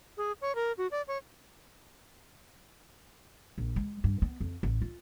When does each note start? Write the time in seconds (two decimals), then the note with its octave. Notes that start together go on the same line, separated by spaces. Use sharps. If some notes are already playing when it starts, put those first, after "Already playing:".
0.17 G#4
0.41 C#5
0.55 A#4
0.78 F#4
0.91 D5
1.08 C#5
3.58 A#1
3.76 G#3
4.04 G2
4.22 B3
4.41 F2
4.63 A1
4.82 F4